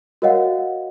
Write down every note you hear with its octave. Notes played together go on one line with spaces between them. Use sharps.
F#4 A#4 C#5 D#5 F5 F#5